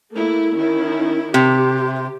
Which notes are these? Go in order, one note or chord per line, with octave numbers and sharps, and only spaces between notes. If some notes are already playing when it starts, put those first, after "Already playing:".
A3 A#3 E4
D#3 C#4 E4
C3 G4